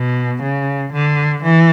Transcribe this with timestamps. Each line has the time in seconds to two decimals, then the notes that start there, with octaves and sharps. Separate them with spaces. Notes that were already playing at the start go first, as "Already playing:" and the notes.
Already playing: B2
0.42 C#3
0.92 D3
1.42 E3